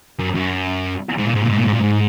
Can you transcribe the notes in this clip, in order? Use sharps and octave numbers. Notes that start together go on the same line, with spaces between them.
F#2
F#2
G#2
A#2
G#2
A#2
G#2
A#2
G#2
A#2
G#2